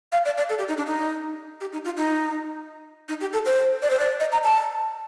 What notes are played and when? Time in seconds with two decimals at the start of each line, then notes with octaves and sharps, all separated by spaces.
0.12 F5
0.25 D5
0.37 D5
0.49 A4
0.58 G4
0.68 D#4
0.77 D4
0.86 D#4
1.61 G4
1.72 D#4
1.85 F4
1.97 D#4
3.09 D#4
3.20 G4
3.33 A4
3.46 C5
3.82 D5
3.90 C5
3.99 D5
4.20 D#5
4.32 A#5
4.44 A5